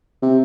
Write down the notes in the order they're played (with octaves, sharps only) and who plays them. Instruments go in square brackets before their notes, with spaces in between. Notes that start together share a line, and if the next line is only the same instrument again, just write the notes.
[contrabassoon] C3